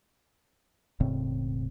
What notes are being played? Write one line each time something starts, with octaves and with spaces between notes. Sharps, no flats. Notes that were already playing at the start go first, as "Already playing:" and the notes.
E1 A2 C#3 C4